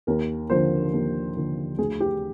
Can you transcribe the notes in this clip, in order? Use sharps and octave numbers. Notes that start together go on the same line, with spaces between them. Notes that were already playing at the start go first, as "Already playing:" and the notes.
D#2 A#4
D3 F3 A#3 C5
D#2
D3 F3 A#3
D2 G#4
G4